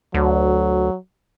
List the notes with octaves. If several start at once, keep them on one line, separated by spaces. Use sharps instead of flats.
D2 F#3